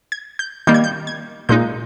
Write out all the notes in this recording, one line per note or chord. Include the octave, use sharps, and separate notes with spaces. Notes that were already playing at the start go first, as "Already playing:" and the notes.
G#6
G6
D#3 G3 A#3 G6
G#6
G6
G#6
A#2 G#3 D#4 G6